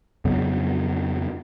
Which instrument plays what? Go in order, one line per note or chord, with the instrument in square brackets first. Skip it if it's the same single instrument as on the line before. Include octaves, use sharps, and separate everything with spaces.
[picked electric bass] F2 C#3 F#3 B3